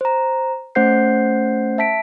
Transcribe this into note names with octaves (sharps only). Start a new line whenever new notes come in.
C5 A#5
A3 C#4 C5 F#5 G6 C7
E5 A5 B6 D7